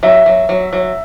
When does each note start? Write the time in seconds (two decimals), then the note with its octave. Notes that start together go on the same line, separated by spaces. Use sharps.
0.03 F#3 E5
0.26 F#3
0.49 F#3
0.73 F#3